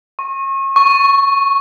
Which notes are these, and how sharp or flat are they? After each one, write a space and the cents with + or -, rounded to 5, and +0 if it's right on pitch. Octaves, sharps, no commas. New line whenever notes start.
C#6 -35
C#6 +0